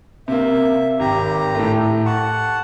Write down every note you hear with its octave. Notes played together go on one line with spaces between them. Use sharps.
C3 A#3 E5
G#1 G4 A#5
A2 A3
F#5 A5 C#6